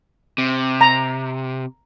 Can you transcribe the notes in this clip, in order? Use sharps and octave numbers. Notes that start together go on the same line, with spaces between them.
C3
A#5